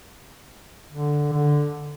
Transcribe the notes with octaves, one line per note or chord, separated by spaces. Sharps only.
D3
D3